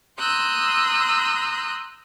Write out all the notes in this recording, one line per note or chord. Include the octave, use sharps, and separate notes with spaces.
A#5 C6 D#6 E6 F#6 G6